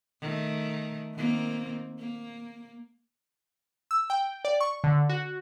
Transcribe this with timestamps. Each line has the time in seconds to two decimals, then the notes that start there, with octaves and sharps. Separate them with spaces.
0.22 D#3 A3
1.15 D#3 A#3 C4
1.99 A#3
3.91 E6
4.10 G5
4.45 D5
4.61 C#6
4.84 D3
5.09 F#4